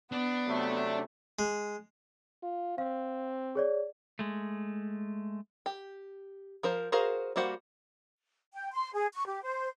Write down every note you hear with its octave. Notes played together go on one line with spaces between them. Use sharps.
B3 D4
C3 F#3 A3
G#3
F4
C4 F5
G#4 C#5 D5
G#3 A3
G4
F3 A#4 C5
F#4 G#4 A#4 C5 F5
G3 A#3 F#4 C5 F#5
G5
C6
G#4
C#6
G4
C5